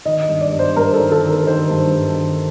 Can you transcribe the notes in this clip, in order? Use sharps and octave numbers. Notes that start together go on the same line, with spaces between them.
D#3 D#5
D#5
G2
D5
G2
C5
G2 A#4
A4
D#3
A4
D#3
A#4
D#3 C5
G2
G2
D#3